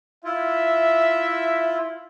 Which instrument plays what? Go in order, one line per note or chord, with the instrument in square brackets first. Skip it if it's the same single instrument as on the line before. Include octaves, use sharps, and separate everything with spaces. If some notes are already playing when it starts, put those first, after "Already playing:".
[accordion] E4 F4 [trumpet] E5